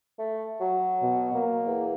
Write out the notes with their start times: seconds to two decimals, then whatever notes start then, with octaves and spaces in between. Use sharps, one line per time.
0.19 A3
0.60 F#3
1.02 B2
1.34 A#3
1.66 E2